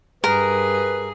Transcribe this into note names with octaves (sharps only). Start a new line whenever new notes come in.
G2 G#4 A#4 B4